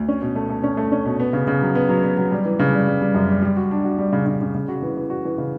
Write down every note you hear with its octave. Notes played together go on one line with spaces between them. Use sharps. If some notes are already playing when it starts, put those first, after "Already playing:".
Already playing: D2
C#4
B2
A3
A3
C#4
A3
C#4
B2
B3
C#3
C#3
F#3
B3
F#3
B3
F#3
G3
E3
C#3
G3
G3
G3
F#2
G3
G3
F#4
D4
F#4
G3
C#3
C#3
C#3
C#3
F#4
E3
E3
F#4
E3
C#3